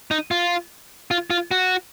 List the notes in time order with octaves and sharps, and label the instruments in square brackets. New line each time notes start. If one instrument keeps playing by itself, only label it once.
[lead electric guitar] D#4
F4
F4
F4
F#4